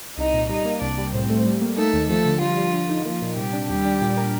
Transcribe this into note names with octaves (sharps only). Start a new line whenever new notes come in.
C2 D#4 D#5
A#2
G3 D#4 D#5
A#3
C2 D4 D5
G3
A2 C4 C5
A3
G3
A#3
A3 D#4 A4
D#2
F3 A3 A4
D3
F3 G3 F4
G3
D3
D#4
F3 A#3 F4
A#2
C3 G3 G4
D4
D#2 G3 G4
D4
A#2
A#4